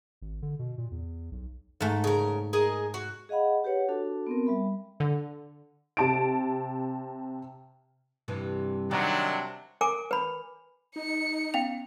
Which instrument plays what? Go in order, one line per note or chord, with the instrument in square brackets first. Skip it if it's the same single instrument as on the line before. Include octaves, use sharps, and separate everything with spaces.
[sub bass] G#1
D3
B2
A#2
E2
B1
[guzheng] G#2 A3
[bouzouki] C#3 A#4
G#4 A#4 D#5
F#4
[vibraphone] G#4 D#5 F5 F#5 B5
G4 B4 C#5 F#5
D4 F#4 A4 A5
B3 C4 A#4
G3 E5 B5
[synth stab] D3
[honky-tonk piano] C3 A5 D7
[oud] G2 C3 E3
[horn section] C3 F#3 D4 [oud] D#3
[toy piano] A#4 G#5 D6
B4 B5
[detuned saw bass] D#4 [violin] C#7
[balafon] B3 C#4 [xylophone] F5 G5 F7